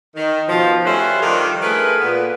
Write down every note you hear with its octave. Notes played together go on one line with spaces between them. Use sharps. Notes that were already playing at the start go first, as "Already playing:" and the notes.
D#3
B2 F3
G3 A3 C#4 B4 C5
D#3 F3 G3 D4 D#4
A3 G#4 A#4 B4
A#2 B3